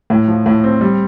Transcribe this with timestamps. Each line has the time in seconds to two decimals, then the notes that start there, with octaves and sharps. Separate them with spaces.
0.10 A2
0.28 F3
0.46 A2
0.64 C4
0.81 G3